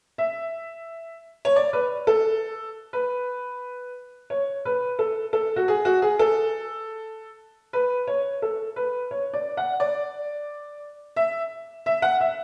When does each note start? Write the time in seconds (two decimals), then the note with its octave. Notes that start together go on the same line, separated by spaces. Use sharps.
0.18 E5
1.45 C#5
1.56 D5
1.73 B4
2.07 A4
2.93 B4
4.30 C#5
4.65 B4
4.99 A4
5.33 A4
5.56 F#4
5.68 G#4
5.85 F#4
6.02 G#4
6.19 A4
7.73 B4
8.07 C#5
8.42 A4
8.76 B4
9.11 C#5
9.33 D5
9.57 F#5
9.80 D5
11.16 E5
11.86 E5
12.02 F#5
12.20 E5